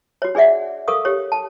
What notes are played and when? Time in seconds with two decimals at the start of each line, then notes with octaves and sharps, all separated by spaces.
0.22 F#4 C#5
0.35 D4 G#4 D5 E5 F#5
0.88 A4 A#4 F5 C#6 D#6
1.05 G4 C#5
1.32 A5